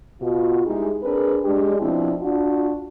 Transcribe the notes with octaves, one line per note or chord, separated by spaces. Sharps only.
B2 F4 F#4
G2 G#3 D#4 E4 G4 G#4
C4 D4 G#4 A#4 B4
G#3 D4 G4
B2 F3 C4 D4 E4
D4 F4 F#4